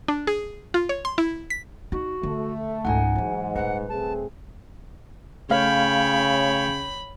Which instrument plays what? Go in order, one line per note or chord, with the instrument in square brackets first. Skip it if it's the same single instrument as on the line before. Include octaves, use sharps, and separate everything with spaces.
[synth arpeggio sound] D4
G#4
F4
C#5
C6
E4
B6
[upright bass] D#4 [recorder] F#4
[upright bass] D3 [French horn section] A3
[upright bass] C#2 G#2 [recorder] D#4 [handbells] F#5 G#5
[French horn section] G#2 [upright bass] E3 F#3
[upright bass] D#1 G#3 [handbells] B4 [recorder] F#5
[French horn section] A3 C4 G#4 [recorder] A5
[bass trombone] C#3 [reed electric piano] A3 F5 [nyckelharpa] C#5 G5 [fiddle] B5